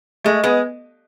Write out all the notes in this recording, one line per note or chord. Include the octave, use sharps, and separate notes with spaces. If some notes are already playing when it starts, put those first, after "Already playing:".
G#3 A3
G#3 B3